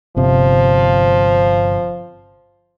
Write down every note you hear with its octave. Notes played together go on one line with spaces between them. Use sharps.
G1 C3 F3